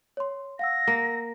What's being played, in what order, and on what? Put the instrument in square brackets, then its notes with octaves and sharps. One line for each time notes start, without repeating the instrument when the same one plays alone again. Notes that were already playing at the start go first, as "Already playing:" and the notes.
[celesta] C#5 C6
[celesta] F5 F#5 E6 [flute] A#6
[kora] A#3